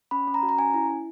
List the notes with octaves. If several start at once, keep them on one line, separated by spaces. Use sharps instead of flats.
C#4 B5
C#4
A#5
F#4
A#5
C#4 G#5
E4
E4